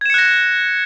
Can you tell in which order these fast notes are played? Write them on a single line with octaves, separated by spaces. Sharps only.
G#6 E7 C#7 F#6 A#6